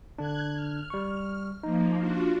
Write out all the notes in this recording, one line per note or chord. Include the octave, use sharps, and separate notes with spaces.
D3 D4 F#6 G#6
F6
G3 C#6
F3 A#3 D#4
D4 F4 F#4